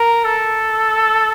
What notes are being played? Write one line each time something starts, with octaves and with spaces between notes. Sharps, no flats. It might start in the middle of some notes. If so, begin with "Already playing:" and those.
Already playing: A#4
A4